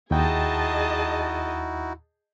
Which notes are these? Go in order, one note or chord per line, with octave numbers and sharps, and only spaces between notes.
D#2 D#4 E4 F#4 G#4 D#5 G5 A5